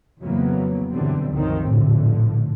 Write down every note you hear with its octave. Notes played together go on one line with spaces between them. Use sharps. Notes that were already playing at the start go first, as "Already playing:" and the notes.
F2 C#3 E3 F#3 A#3 B3
F#2 B2 D3 E3 G3 C4
C2 F#2 D#3 F3 F#3 C4
F1 A#1 A2 D3 F3